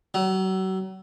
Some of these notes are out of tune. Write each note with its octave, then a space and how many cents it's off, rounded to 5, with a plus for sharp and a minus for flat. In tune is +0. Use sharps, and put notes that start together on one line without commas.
F#3 +35